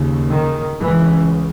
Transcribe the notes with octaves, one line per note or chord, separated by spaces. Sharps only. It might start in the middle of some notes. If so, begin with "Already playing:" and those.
Already playing: D#2 C#3
D#3
C#2 C#3 E3